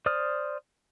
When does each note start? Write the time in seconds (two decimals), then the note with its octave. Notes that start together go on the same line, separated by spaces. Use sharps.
0.06 C5 D5 D#6 F6